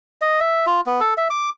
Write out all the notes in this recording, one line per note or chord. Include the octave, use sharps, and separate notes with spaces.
D#5
E5
F4
B3
A4
E5
D6